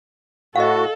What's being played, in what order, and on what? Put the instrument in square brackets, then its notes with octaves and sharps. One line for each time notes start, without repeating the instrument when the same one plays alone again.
[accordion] A2 F#4 [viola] A4 [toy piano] D#5 F5